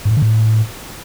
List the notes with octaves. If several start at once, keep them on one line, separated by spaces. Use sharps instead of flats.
G#2
A2
D3
A2